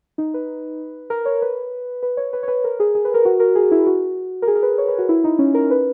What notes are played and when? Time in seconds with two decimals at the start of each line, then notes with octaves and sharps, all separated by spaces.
0.18 D#4
0.34 B4
1.10 A#4
1.25 C#5
1.42 B4
2.03 B4
2.17 C#5
2.33 B4
2.43 C#5
2.48 B4
2.64 A#4
2.80 G#4
2.95 G#4
3.05 B4
3.14 A#4
3.25 F#4
3.40 A#4
3.55 G#4
3.71 E4
3.87 F#4
4.42 A#4
4.47 G#4
4.56 A#4
4.63 B4
4.78 C#5
4.88 B4
4.98 F#4
5.09 E4
5.24 D#4
5.39 C#4
5.54 A#4
5.71 B4